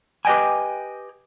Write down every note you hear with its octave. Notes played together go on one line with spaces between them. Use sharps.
G4 B4 D#5 G5 G#5